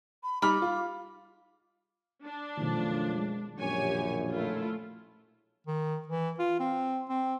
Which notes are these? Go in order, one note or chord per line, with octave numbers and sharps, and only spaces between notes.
B5
G3 D#4 B5 D6 F6
F4
D4
F#2 B2 D#3 F3 A3
G#3
A#1 F#2 G4 C#5 G#5
A3 E4 F4
D#3
E3
F4
C4
C4